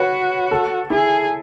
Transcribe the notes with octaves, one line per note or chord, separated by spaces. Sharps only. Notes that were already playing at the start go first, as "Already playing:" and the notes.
Already playing: F#4 B4 C#5
A4
E4 G#4